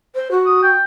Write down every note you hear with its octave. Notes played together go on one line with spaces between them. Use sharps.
C5
F#4
D#6
G5